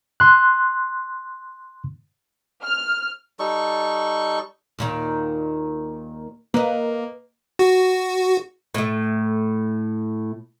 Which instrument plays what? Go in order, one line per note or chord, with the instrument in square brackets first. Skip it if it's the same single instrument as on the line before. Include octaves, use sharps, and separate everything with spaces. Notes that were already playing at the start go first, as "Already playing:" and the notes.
[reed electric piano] C6 F#6
[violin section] F6
[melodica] G3 D#4 A4 C#6
[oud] D#2 A#2 D#3
[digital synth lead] A#3 [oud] B4 D#5
[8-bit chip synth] F#4
[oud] A2 A3